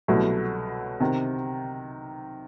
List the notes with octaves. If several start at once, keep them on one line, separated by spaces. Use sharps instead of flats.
C2 B2 F#3 A3
C3 D#3